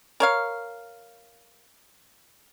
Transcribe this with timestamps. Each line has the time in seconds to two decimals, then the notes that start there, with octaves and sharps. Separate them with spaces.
0.20 A#4 C#5 F5